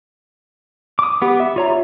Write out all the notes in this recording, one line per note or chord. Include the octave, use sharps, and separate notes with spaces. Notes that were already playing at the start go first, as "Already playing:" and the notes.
D6 D#6
B3 G4
E5
F4 C#5 A#5